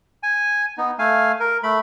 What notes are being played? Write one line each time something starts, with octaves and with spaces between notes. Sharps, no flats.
G#5
B3 D#4
A3 F5 G#5
A#4
A3 B5